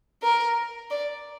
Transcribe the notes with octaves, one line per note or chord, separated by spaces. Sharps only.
A#4
D5